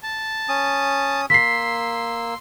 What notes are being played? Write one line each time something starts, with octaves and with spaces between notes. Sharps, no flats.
A5
C#4 D#6
A#3 C6 E6 B6 C7